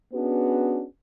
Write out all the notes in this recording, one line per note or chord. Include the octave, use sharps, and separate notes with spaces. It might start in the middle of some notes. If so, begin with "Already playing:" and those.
B3 C#4 D4 F#4 G#4 B4